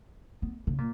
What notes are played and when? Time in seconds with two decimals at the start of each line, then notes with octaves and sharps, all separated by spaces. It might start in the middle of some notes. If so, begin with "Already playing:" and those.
0.42 B3
0.67 C#3
0.78 A#2